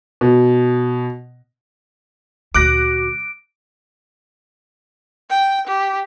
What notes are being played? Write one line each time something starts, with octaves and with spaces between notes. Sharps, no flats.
B2
D2 A#2 F#4 D6 F#6 A#6 D7
G5
G4